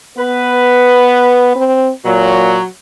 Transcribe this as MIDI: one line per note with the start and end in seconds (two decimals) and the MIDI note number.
0.18 1.53 59
0.18 1.60 71
1.56 1.90 60
2.05 2.59 46
2.05 2.63 54